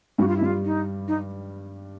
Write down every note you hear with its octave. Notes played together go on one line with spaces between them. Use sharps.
G2 G3 F#4
F4
E4
G2 G3 F4
D#4
D#4